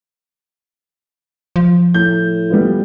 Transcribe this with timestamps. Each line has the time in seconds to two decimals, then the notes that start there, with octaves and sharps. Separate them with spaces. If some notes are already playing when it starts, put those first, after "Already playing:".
1.56 F3
1.94 A2 G6
2.50 G3 B3 F4